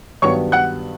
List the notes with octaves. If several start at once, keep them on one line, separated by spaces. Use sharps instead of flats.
G2 D#3 F#3 B3 C#5 C#6
F#5 F#6